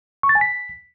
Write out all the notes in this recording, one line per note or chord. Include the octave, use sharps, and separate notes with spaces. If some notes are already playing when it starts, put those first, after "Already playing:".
C#6
A6
G#5
B6